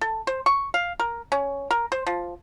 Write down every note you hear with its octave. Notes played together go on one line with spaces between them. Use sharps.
A4
C5
C#6
F5
A#4
C#4
A#4
C5
F3